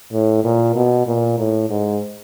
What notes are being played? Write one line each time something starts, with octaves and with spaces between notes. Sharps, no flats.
A2
A#2
B2
A#2
A2
G#2